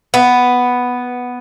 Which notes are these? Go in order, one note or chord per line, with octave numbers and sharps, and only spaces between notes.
B3